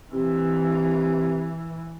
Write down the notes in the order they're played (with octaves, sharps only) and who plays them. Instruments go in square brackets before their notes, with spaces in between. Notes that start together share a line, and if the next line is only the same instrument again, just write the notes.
[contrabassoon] C3 [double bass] E3